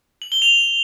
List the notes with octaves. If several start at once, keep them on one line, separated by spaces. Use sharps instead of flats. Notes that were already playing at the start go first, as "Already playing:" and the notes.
F#7
G7
F7